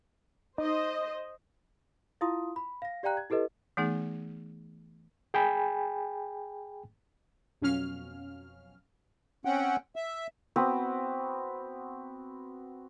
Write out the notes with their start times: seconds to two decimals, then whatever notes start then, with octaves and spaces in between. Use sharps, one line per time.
0.58 D#4 C5 D#5
2.21 E4 F4 F5 C6 D#6
2.56 B5
2.82 F5 A#6
3.03 G4 D5 F5 G5 A#5 F#6
3.17 G#6
3.30 E4 G4 A4 B4 D#5
3.77 E3 A3 B3 D#4 G#4
5.34 G#4 G5 G#5 B5
7.62 F2 B2 F#3 C#4 F5 F6
9.45 C4 C#4 F#5 G5
9.96 E5
10.56 B3 C4 F#4 B4